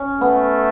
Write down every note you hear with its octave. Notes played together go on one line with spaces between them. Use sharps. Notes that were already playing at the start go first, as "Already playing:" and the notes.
Already playing: C#4
A3 B3